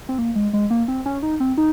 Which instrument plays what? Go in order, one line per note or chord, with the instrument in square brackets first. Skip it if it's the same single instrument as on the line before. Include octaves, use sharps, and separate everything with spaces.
[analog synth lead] C4
A#3
G#3
G#3
A#3
C4
C#4
D#4
C4
D#4